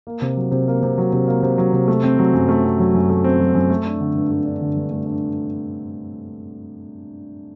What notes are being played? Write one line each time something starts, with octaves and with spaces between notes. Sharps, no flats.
A#3
C3
F#3
C3
A#3
C3
F#3
C3
A#3
C3
F#3
C3
A3
C4
F#3
F#2
A3
C4
F#3
F#2
A3
C4
F#3
F#2
A3
D4
D3
G2
A3
D4
D3
G2
A3
D4